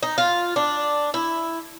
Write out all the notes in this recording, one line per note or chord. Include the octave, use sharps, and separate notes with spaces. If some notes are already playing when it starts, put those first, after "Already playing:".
D#4
F4
D4
E4